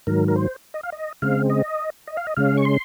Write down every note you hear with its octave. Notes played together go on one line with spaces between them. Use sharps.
G#2 D#3 F#3 A#4
A#4
C5
D#5
F5
D#5
C#3 G#3 C4 F5
D#5
D#5
F5
D#5
C#3 G#3 C#4 F5
C#6
C6